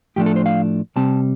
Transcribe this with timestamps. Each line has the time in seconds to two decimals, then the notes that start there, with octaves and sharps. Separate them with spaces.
0.16 A2 F3 A3 D4 G4
0.26 A4
0.36 C5
0.46 F5
0.96 C3 G3 C4 A5